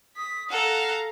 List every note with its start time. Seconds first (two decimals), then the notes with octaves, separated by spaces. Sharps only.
0.17 D#6 B6
0.50 A4 F5 F#5 A#5